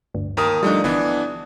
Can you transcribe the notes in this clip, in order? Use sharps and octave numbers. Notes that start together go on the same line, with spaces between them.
G1 D2 G2
D#2 A#4 D#6
F3 G3 A3 D4 D#4
G1 E3 B3 D4